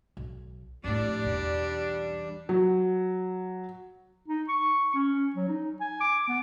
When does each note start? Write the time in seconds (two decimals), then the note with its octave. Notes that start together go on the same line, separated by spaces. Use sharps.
0.17 B1
0.84 F2 A2 G3 D4
1.24 B1 E2
2.49 F#3
4.28 D#4
4.49 C#6
4.95 C#4
5.36 F#3
5.49 D#4
5.81 G#5
6.01 D6
6.28 B3